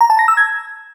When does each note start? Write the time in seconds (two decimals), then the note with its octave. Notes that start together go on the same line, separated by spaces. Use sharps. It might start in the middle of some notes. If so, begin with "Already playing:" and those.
0.01 A#5
0.10 A5
0.19 A#6
0.28 E6
0.37 G#6